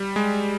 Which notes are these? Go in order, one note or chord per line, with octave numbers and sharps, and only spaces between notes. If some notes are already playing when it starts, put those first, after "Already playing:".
Already playing: G3
G#3